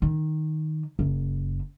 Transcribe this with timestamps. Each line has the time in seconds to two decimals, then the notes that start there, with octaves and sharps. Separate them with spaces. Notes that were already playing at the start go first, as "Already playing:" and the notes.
0.02 D#3
0.99 F#1